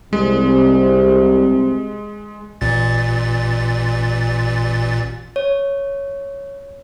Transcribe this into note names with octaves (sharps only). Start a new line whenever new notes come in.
C2 C3 G#3
A1 A#2 A6
C#5